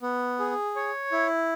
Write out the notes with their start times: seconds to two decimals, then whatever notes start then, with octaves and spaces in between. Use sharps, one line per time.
0.02 B3
0.40 G#4
0.76 C#5
1.12 E4